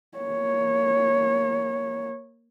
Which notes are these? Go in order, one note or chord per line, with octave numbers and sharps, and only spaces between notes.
A#3 C#5